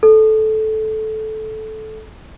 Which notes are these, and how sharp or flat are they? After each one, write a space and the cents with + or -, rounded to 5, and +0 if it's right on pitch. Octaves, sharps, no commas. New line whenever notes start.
A4 -15